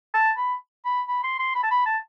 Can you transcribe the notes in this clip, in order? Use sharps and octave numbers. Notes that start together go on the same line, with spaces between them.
A5
B5
B5
B5
C6
C6
B5
A5
B5
A5